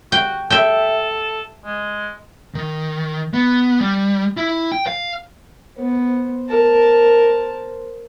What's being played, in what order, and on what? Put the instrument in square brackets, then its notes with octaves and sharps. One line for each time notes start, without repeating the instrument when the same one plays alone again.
[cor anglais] F#4 [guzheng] G5
[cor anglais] A4 [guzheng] E5 G5
[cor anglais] G#3
[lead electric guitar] D#3
B3
G3
E4
G5
F5
[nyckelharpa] B3 [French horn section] C5
[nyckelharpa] A#4 A5